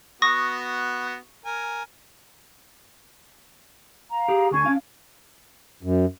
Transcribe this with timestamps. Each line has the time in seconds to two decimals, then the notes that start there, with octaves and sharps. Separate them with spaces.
0.22 B3 F#4 C#6 D#6 A#6
1.45 A#4 G#5
4.10 F5 A#5
4.28 G4 G#4
4.51 D2 D4 G#5 C#6 G#6
4.66 C#4 D4 F5
5.83 F#2